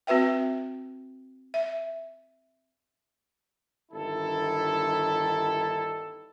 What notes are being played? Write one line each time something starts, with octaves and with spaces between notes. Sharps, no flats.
C4 F#4 B4 E5 G5
E5
G1 D3 D#3 E4 A4